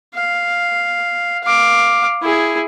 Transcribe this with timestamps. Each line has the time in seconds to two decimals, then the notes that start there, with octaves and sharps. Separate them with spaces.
0.15 F5
1.43 F5 D6
2.22 E4 G#4